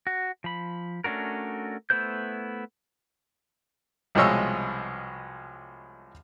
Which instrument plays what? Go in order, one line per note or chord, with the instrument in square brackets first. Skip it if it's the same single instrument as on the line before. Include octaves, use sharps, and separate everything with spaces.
[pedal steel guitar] F#4
F3 B5
A3 C#4 D4 F#4 A#4
A3 B3 E4 C5 G6
[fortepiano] C2 B2 F3 G#3 C#5 E6